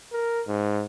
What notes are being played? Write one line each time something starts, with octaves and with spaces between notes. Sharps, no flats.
A#4
G#2